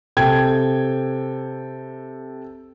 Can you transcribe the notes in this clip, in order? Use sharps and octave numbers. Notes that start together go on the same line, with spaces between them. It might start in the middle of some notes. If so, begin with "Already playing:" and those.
C3 A4 G5 G#6